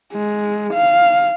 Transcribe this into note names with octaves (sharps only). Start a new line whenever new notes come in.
G#3
F5